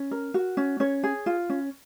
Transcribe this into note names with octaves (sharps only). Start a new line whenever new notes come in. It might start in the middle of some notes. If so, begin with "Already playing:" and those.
Already playing: C#4
A#4
F#4
C#4
C#4 C#5
G#4
F4
C#4